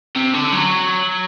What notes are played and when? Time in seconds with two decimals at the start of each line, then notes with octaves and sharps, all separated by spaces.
0.16 C3
0.34 D3
0.52 F#3